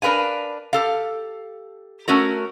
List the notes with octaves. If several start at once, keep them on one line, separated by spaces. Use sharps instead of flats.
D4 A#4 B4 F5 G#5
G4 A4 F5
A3 C#4 F#4 A#4